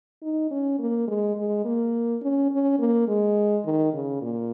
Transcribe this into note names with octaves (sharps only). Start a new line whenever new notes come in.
D#4
C#4
A#3
G#3
G#3
A#3
C#4
C#4
A#3
G#3
D#3
C#3
A#2